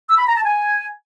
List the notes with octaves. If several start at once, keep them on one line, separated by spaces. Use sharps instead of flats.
E6
B5
A#5
A5
G#5